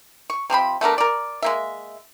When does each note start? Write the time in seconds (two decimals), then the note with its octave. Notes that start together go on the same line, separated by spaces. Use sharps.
0.30 C#6
0.50 C3 F3 C4 B5
0.81 A3 B3 D4 A#4
0.98 A#4 D5
1.43 G#3 A#3 E5